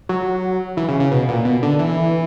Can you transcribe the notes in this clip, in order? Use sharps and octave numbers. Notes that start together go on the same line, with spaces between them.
F#3
E3
C#3
C#3
B2
A#2
B2
D3
E3